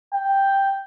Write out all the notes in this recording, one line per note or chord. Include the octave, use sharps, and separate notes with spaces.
G5